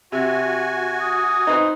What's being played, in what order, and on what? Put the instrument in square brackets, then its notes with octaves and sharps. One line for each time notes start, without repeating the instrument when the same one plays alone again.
[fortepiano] C3 [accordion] F#4 G#5
[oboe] D#6
[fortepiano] D#4 B4 C5